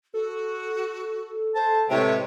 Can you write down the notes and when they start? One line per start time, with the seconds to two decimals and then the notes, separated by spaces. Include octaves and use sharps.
0.14 F#4 A4
1.55 C5 A5
1.90 A2 C3 G#3 B4 C#5